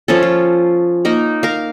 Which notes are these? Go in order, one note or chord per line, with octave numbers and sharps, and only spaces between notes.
F3 C#4 A4
F4
A#3 D#4 A#4
A#4 F5